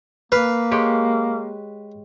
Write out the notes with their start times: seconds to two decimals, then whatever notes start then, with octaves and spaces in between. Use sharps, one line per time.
0.32 A#3 B4 F5
0.71 G#3 G4 C#5